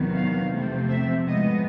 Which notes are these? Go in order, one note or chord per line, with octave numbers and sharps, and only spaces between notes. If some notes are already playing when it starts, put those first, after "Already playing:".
Already playing: E2 C3 D#3 F#3 B3
F5
C3 F3 A3 C4
E5
A2 F3 G#3 B3 D#5